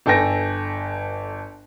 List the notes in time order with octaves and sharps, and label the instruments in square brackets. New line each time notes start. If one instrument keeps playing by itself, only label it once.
[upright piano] G1 A4 B4 G5 G#5 A#6